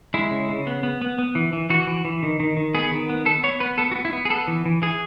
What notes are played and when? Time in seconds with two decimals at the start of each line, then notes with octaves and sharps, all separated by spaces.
0.14 G#3 E4
0.31 C#3
0.49 C#3
0.67 B3
0.83 B3
1.02 B3
1.19 B3
1.35 E3
1.53 E3
1.70 E3 F#4
1.87 E3
2.05 E3
2.23 D#3
2.40 D#3
2.57 D#3
2.75 B3 G#4
2.91 D#3
3.10 B3
3.25 B3 A4
3.43 B3 C#5
3.60 B3 B4
3.78 B3 A4
3.92 F#4
3.96 B3
4.05 E4
4.13 B3
4.25 G#4
4.30 B3 A4
4.48 E3
4.66 E3
4.82 E3 G#4